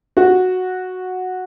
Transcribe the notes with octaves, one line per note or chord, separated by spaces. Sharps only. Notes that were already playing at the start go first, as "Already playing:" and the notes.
F#4